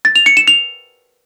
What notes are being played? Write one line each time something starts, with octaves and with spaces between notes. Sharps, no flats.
A6
F7
C#7
E7
F7